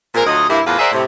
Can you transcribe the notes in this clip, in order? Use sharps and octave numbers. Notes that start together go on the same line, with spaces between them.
A#2 G#3 C4 A#4
D2 F#3 F4 D#5
G2 C3 A#3 E4
E2 A2 A#3 F4 B4
G#4 A#4 C5 D5 E5 F#5
A2 C3